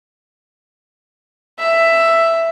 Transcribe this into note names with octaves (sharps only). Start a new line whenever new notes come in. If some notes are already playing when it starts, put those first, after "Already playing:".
E5